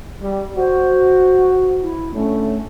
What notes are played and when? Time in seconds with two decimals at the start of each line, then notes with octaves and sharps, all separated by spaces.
0.21 G3
0.57 F#4 C5
1.82 E4
2.14 A2 D3 A3 C#4